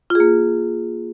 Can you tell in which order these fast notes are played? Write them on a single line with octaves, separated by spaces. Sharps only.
F4 G#4 A#3